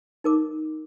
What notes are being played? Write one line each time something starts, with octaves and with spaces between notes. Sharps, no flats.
D#4 A#4 D6